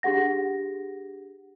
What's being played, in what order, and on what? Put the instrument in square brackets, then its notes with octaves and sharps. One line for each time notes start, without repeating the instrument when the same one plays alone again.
[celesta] D4 G4 G#4 F#5 A#6